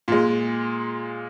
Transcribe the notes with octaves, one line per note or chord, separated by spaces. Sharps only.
A#2 G#3